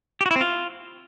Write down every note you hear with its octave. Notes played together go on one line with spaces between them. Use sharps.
G4
F#4
E4
C4
F4